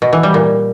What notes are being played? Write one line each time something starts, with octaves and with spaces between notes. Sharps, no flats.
B2
E3
G3
A#2